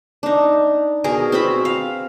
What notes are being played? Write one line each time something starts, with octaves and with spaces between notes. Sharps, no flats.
D4 D#4
B2 G#4 A#4 G#5
C4 F#4 E5 B5
F5